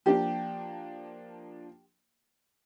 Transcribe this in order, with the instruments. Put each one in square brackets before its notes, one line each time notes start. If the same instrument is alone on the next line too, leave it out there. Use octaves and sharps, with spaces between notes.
[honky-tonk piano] F3 A#3 D4 [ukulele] G4